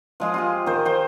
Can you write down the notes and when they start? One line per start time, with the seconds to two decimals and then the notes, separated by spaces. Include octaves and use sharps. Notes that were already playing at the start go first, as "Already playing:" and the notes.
0.20 F3 G#3 F4
0.34 F4 G4 G#4
0.66 D#3 C5
0.85 C5 G5